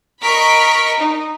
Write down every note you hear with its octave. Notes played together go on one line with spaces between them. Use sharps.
A#4 D#5 B5 C#6 B6 D7
D#4